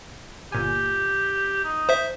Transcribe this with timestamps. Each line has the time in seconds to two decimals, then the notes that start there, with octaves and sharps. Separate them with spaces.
0.52 G1 A#2 G4 G#5
1.64 D#4
1.89 C5 E5